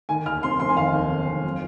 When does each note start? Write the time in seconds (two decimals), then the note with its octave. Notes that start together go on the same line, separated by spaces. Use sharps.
0.09 D#3 G#5
0.26 D#2 F6
0.43 F1 C6
0.60 F1 C6
0.69 G#5
0.77 D#3 F5
0.94 D#2
1.10 F1
1.27 F1
1.44 F3